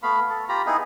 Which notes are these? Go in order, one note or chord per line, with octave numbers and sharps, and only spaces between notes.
A3 B3 F5 B5
A4
F4 G4 A#5 B5
B3 D#4 E4 G#4